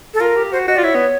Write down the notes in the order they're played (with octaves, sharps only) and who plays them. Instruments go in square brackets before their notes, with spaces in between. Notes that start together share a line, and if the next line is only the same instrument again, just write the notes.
[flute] A4
[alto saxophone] F4 [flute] A#4
[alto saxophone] G4
[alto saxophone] F#4 [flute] C5
[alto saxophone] F#4 [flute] D#5
[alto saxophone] F4 [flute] D5
[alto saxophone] E4 [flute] C#5
[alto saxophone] B3